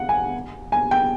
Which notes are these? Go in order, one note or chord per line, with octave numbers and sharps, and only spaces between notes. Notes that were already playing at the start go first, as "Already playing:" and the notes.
Already playing: F5 F#5
G#5
G#5
G5